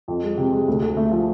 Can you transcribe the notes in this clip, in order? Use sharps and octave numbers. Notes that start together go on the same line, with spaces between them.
F2
G#3
C3
G#3
D2
D2
A3
F3